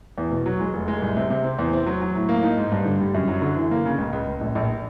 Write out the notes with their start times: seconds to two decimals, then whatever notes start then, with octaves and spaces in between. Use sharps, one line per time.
0.18 E2
0.31 B2
0.46 F#3
0.60 G#3
0.73 F1
0.88 G#3
1.02 C2
1.17 C3
1.30 C3
1.44 C4
1.59 E2
1.73 C4
1.86 F#3
2.02 F#3
2.15 A2
2.29 A#3
2.43 D#4
2.57 G#2
2.72 G2
2.85 D3
3.00 G3
3.14 F#2
3.28 F#3
3.42 D3
3.56 E3
3.71 A#3
3.85 C#3
3.98 C#2
4.13 C#2
4.27 C#2
4.41 A#1
4.55 A#1